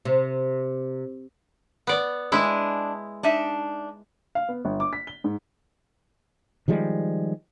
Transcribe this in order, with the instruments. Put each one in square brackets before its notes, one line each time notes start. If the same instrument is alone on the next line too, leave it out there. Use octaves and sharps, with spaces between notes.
[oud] C3
[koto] B3 D5
[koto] G#3 E4 [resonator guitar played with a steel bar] D4 G#5
[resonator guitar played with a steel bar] D4 D#4 E5
[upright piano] F5
B3
G1
D6
B6
G7
G#2
[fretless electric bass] D#3 F3 G3 G#3